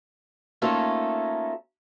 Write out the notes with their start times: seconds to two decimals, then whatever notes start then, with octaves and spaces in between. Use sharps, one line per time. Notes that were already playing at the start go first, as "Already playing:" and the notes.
0.62 A3 A#3 C#4 D#4 F4 A4